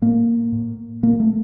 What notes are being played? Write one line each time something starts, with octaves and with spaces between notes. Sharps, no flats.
A2 A#3
A2
A#2 A#3
A3